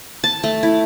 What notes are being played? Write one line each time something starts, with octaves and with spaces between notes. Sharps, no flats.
A5
A3
E4